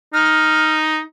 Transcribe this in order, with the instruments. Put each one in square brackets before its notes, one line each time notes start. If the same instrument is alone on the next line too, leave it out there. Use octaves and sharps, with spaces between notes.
[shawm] D#4 [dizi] F6